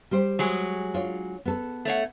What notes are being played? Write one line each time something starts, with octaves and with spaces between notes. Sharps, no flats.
G3 G4 C5
F#3 G#3 G#4
D4 F4 C#5
B3 A4
A3 C#5 F#5